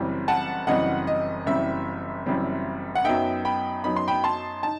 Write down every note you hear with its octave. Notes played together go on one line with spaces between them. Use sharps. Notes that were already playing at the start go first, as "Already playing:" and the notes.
Already playing: F#1 F#2 E3 G3 C4
F#5 A5
F#1 F#2 E3 G3 C4 D#5 F#5
D#5
F#1 F#2 E3 G3 C4 E5
F#1 F#2 E3 G3 C4
F#5
F#2 F#3 B3 D#4 E5 G5
G5 B5
F#2 F#3 B3 D#4 B5
C6
G5 B5
A5 C6
D#4 A5